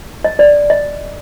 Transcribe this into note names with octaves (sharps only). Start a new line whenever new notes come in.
D#5
D5
D#5